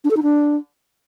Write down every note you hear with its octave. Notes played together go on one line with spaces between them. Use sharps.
D4
A4
D#4
D4